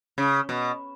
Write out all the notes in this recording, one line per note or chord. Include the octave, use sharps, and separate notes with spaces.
C#3
B2